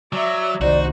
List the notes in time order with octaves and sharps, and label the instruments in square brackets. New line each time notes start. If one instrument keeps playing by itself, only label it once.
[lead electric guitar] F#3 [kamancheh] D5 E5
[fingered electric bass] C2 D#3 [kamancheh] D#4 C5 [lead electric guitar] F#4 [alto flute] D5